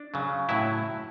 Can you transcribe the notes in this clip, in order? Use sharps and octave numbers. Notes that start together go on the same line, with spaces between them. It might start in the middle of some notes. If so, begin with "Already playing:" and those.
Already playing: D4
C#3 F#3
A2 F#3 E4